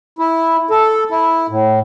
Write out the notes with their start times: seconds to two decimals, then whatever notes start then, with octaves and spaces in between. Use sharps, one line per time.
0.19 E4
0.70 A4
1.11 E4
1.49 A2